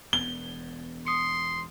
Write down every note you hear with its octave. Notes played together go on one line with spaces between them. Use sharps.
E1 B3 G7
C6 D#6 C#7